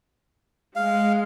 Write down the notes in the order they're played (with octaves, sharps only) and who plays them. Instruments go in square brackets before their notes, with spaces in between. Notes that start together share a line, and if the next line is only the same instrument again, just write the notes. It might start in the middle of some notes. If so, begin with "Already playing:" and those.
[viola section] G#3 [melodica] F5